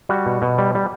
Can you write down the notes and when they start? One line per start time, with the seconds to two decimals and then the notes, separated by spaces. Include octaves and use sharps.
0.09 G3 F#4
0.26 B2
0.42 B2
0.58 G3
0.75 G3